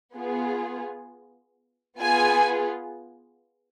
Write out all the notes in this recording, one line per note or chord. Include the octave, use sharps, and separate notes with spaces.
B3 F4 G#4
B3 F4 G#4 G#5